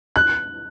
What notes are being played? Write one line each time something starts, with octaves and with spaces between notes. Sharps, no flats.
F#6